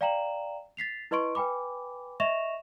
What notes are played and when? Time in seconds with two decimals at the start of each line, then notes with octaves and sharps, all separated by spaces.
0.01 D5 F5 G5 A#5 E7 F#7
0.77 A6 B6 C7 F7
1.11 E4 B4 D#5 C6 C#6 D7
1.35 B4 G5 G#5 B5 D6
2.20 D#5 E5 C#6 A#6 E7 F7